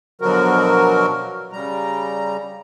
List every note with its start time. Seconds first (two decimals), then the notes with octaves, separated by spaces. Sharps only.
0.21 B2 D3 F3 F#3 F#4 A#4
1.52 C#3 G3 A#5